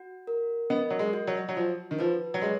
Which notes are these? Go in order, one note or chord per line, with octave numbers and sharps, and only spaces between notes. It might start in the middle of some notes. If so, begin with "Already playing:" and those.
Already playing: F#4
A#4
B3 D#5
F#3
G#3
F#4
F#3
F#3
F3 F#4
D#3
F3 B4
F#3
G#3 C#5